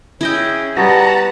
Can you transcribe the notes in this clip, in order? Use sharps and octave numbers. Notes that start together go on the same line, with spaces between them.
C#4 E4 G#4 D#5 G5
G3 B3 F#4 B4 F#5 A5 A#5